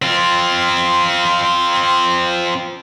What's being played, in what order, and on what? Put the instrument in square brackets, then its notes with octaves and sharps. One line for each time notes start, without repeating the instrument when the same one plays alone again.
[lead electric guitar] C4 F4